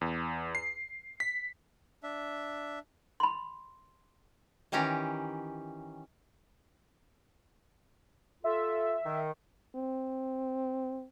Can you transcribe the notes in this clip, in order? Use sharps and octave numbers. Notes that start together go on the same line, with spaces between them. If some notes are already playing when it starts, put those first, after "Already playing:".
E2
C7
B6
D4 E5
B5 C6
D#3 E3 C#4 G4 A#5
F4 A4 E5
D#3
C4